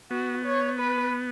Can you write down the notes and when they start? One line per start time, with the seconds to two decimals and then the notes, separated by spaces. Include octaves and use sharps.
0.11 B3 F#4
0.45 C#5
0.79 B4